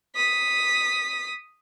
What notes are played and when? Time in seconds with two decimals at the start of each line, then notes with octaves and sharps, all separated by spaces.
0.16 D#6 B6